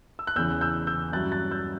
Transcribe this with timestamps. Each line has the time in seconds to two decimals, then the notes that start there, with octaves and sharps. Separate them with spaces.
0.19 E6
0.27 F#6
0.36 E2 C#3 E3 E6 G6
0.61 E6 G6
0.87 E6 G6
1.12 G2 F#3 C#4 E4 F#6 A6
1.32 F#6 A6
1.51 E6 G6